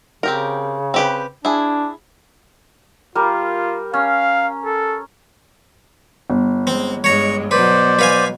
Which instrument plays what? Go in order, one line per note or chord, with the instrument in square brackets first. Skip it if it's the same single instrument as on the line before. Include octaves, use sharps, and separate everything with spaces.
[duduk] C#3 [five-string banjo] C4 G4 A#4
[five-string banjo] C4 G4 B4
[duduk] D4 [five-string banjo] E4 G#4
[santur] G3 A#4 [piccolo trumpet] F4
[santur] C#4 [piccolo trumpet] F5
[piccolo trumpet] A4
[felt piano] G1
[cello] G#3 [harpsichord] C4
[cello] G2 G#3 [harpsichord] C#5 A#5
[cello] B2 F#3 [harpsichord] B4 [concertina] C5 D5
[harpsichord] B4 F5 G#5